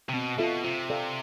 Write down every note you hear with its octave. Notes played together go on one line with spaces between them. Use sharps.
C3
B2 C4
B2 F4 A4 E5
C3 F4
A4 D5 F5